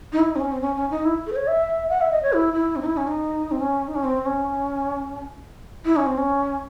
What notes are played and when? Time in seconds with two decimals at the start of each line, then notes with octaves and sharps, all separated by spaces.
0.13 D#4
0.19 E4
0.31 D#4
0.36 C4
0.40 C#4
0.51 C4
0.61 C#4
0.76 C#4
0.90 D#4
1.05 E4
1.27 A4
1.33 C5
1.36 C#5
1.47 E5
1.90 F#5
2.01 E5
2.12 D#5
2.23 C#5
2.33 E4
2.54 E4
2.76 C4
2.82 D#4
2.86 E4
2.97 C#4
3.08 D#4
3.51 C4
3.60 C#4
3.88 D#4
3.95 C#4
4.04 C4
4.26 C#4
5.85 E4
5.96 C#4
6.06 C4
6.18 C#4